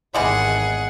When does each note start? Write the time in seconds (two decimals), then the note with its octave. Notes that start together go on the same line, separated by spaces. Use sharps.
0.14 G#1 E2 E3 G3 G#3 G#4 F#5